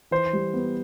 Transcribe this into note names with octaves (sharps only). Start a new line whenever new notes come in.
E3 C5
G3
B3